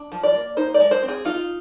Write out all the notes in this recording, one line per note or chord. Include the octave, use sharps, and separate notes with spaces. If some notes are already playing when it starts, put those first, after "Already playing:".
Already playing: D4
F3
D5
A#3
D#4 C5
D5
G#3
C5
C4
G#4
D#4 F4